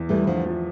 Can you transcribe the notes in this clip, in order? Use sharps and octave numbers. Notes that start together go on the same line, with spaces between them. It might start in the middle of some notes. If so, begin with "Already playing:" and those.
Already playing: E2
E3 G3 A3
D3 F3
F3